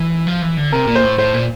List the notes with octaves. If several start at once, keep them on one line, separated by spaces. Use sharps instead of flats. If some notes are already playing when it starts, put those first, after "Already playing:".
Already playing: E3
F3
E3
D3
C3 A#4
A#2
C5
A2
A2 C5
A#2